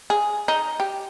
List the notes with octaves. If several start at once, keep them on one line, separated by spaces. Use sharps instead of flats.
G#4
D#4
G4